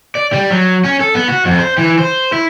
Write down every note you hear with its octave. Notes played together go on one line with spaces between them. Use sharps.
D5
G3
F#3
C#4
A4
B3
F#4
F2
C5
E3
C5
E4